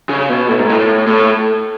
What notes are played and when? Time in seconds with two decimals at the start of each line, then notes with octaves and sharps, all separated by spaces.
0.09 C#3
0.29 B2
0.49 A2
0.59 G#2
0.69 A2
1.07 A2